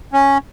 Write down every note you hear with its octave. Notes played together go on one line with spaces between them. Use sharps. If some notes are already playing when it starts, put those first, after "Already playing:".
C#4